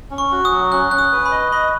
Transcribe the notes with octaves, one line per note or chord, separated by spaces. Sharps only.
C#4
C#6
F#4
D#6
F#3
C#4 F#6
C#4 F#6
D#6
B4
B5
D#5
D#5 B5